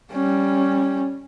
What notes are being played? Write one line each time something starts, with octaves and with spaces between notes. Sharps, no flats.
G3 C#4